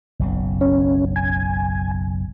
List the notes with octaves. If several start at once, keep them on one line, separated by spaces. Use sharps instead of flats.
F#1 B1 C#3
C#4
G#5